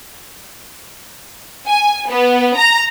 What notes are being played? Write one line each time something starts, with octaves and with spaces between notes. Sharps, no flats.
G#5
B3
A#5